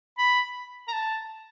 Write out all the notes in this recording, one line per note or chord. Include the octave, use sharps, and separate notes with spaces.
B5
A#5
A5